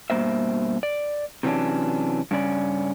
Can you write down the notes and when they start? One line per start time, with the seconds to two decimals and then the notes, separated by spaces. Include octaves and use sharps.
0.10 G2 B2 E3 A#3 C5 E5
0.83 D5
1.43 C3 E3 F#3 C#4 D4
2.31 G2 C#3 C#4 D5